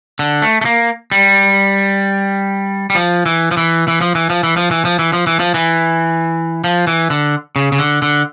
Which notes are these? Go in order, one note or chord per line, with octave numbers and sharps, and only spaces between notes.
D3
A3
A3
A#3
G3
G3
F3
E3
F3
E3
E3
F3
E3
F3
E3
F3
E3
F3
E3
F3
E3
F3
E3
F3
E3
D3
C#3
C#3
D3
D3